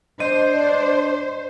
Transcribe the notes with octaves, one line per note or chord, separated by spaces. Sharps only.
D4 C5 D#5